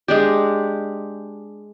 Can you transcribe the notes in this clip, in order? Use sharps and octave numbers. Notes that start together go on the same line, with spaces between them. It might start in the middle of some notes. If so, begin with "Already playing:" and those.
G#3 D4 G4